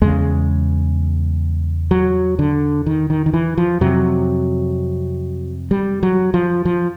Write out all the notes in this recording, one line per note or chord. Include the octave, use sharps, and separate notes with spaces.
E2 C#3 G#3
F#3
D3
D#3
D#3
D#3
E3
F3
F2 C3 F#3
G3
F#3
F3
F3